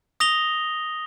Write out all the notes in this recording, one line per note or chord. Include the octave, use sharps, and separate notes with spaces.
D#6 A#6 F7 G7